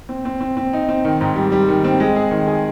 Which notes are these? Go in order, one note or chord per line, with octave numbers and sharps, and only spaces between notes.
C4
C4
C4
C4
D#4
C4
D#3
G#2
G3
G3
D#3
C4
G#3
G#4
D#3
G#4